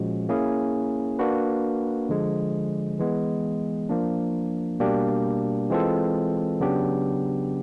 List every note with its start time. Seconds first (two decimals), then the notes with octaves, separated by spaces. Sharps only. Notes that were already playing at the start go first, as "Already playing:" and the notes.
Already playing: A#2 F3 G#3 C#4 F#4
0.29 A#3 C#4 E4 G#4
1.19 A#3 D4 F#4 B4
2.09 D3 F3 G#3
2.99 E3 G#3 B3
3.89 F3 A#3 D4
4.80 B2 G3 A#3 D4 G4
5.70 E3 G#3 C4 F4 A4
6.60 C#3 F#3 B3 D4 G4